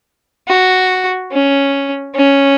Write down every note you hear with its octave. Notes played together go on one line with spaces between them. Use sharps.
F#4
C#4
C#4